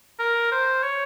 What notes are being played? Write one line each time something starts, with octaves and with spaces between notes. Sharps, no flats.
A#4
C5
C#5